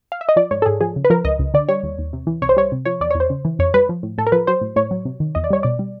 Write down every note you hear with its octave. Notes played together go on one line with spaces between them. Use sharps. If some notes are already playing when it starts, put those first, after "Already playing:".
F5
E5
D#5
F3 D5
G#2 C#5
A4
G#2 G#4
F3 G#4
C#3
B4
F3 A#4
C#2 D#5
C#2
D3 D5
G3 C#5
D#2
D#2
C3
E3
C2 C#5
C5
G3 C#5
C3
F3 C#5
E2 D5
C#5
E2
C5
C#3
E3
F2 C#5
G3 B4
F3
A2
A2 A4
A#4
F3 B4
F#3 C5
A2
A2 C#5
F#3
C3
D#3
E2 D#5
D5
G3 C#5
B2 D5
G3